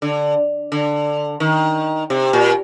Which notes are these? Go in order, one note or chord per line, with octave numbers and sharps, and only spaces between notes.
D3
D3
D#3
C3
A#2